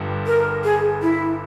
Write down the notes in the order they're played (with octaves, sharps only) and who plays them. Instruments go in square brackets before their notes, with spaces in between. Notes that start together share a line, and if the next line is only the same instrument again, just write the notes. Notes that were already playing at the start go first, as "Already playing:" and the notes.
Already playing: [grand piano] G1 G2 G3
[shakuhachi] A#4
G#4
E4